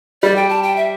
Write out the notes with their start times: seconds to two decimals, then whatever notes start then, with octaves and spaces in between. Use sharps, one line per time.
0.23 G3 D5
0.36 G5
0.49 A5
0.63 G5
0.76 E5